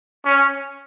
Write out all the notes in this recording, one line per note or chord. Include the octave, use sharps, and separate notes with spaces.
C#4